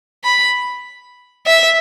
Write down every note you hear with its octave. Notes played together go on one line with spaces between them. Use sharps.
B5
E5